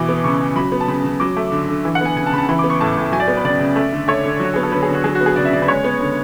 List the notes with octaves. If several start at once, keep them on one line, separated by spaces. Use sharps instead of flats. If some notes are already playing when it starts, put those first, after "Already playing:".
Already playing: B2 E3 D6
B3
C#3 C#6
C#3
F#3 B5
B3
A5
C#3 B5
C#3
F#3 D6
A3
D3
D3
E3
F#5
B3 G#5
C#3 G#5
A5
C#3 B5
A5
E3 B5
D6
B3
C#6
A2 A5
A2
F#3 G#5
D5
B3
B4
C#3 D5
C#3
A3
D3
A3 C#5
D3
F#3 F#4
B3 G#4
A4
D3 B4
G#4
D3
F#4
F#3 G#4
F#4
B3
G#4
C#3 D5
E5
C#3 D5
B4
G#3 C#5
B3
D3